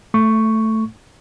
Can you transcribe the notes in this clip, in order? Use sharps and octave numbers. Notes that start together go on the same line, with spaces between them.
A3 C#6